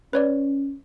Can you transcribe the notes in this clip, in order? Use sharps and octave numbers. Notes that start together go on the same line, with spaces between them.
C#4 B4 C#5 D5